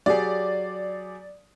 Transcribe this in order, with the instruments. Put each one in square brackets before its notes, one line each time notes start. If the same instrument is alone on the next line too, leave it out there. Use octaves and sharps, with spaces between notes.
[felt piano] F#3 G4 G#4 [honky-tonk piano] D5